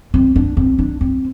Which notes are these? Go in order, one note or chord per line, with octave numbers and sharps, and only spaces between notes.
C4
D4
C4
D4
C4